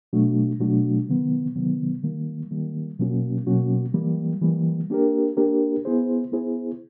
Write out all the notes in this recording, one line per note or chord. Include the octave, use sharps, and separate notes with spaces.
B2 F#3 A3 D4 F#4
B2 F#3 A3 D4 F#4
C3 D#3 F#3 B3
C3 D#3 F#3 B3
D#3 G3 A#3
D#3 G3 A#3
B2 F#3 A#3 C#4 F#4
B2 F#3 A#3 C#4 F#4
E3 G3 A#3
E3 G3 A#3
A#3 D4 G4 A#4
A#3 D4 G4 A#4
B3 E4 G#4 C5
B3 E4 G#4 C5